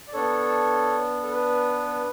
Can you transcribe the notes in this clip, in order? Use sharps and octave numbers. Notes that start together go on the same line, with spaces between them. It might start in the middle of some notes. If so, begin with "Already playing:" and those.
D5
B3 D4 A4 C#5
A4
B4